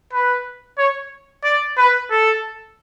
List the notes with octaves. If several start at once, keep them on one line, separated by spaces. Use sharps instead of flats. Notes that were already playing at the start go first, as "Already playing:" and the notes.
B4
C#5
D5
B4
A4